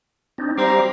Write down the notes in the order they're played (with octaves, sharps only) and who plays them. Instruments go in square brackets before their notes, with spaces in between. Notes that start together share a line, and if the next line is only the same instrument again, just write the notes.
[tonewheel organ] C4 D4 D#4
[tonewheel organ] G3 G4 F5 [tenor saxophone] C4 [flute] A#5